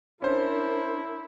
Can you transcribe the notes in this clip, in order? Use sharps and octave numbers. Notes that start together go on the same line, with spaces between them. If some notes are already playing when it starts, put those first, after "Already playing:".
C#4 D4 E4 A#4 C5